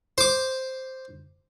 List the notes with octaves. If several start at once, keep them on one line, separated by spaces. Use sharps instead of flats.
C5 D6